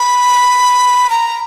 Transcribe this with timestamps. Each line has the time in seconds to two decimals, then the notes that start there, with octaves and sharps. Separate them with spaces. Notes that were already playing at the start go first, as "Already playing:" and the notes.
Already playing: B5
1.10 A#5